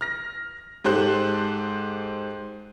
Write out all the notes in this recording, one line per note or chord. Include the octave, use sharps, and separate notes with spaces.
F6 A#6
G#2 G4 A4 C5 F#6 F#7